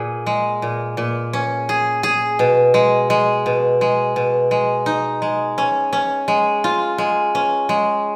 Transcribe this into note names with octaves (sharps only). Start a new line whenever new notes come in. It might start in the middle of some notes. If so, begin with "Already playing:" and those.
Already playing: A#2 G#4
G#3
A#2
A#2
C#4
G#4
G#4
B2
G#3
G#3
B2
G#3
B2
G#3
D#4
G#3
C#4
C#4
G#3
F4
G#3
C#4
G#3